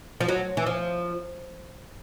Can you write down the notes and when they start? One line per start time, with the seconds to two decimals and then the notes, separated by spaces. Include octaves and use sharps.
0.21 F3
0.28 F#3
0.57 E3
0.66 F3